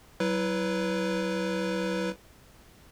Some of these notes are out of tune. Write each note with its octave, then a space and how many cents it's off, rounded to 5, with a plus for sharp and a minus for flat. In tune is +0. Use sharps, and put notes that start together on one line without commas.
F#3 +30 E4 +0 B4 +0